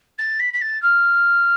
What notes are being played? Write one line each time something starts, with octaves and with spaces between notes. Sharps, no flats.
A6
B6
B6
A6
F6